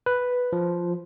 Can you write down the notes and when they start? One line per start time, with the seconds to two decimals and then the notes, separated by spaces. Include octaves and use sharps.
0.06 B4
0.53 F3